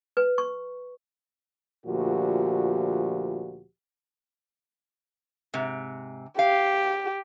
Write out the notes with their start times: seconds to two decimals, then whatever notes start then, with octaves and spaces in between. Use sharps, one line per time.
0.17 B4
0.38 C#6
1.86 D2 A#2 F3 F#4 G4
5.54 G#2 C3
6.39 G4 F5